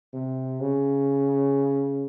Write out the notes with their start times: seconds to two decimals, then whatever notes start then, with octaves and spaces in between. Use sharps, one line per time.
0.14 C3
0.60 C#3